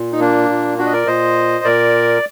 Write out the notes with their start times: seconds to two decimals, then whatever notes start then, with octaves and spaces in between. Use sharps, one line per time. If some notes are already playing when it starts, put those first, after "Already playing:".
Already playing: A#2
0.12 D#4
0.20 A#3 D4
0.49 A#2
0.78 D4 F#4
0.86 D#5
0.92 A#4 D5
1.07 A#2 C5 D#5
1.65 A#2 A#4 D5